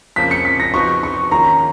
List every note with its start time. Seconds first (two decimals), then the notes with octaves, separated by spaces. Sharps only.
0.16 F2 C#3 F3 A#3 B6
0.31 C#7
0.45 B6
0.60 A#6
0.74 F2 F3 B3 D#4 F#4 C#6
1.03 C#6
1.31 D#3 A#3 C#4 F4 A#5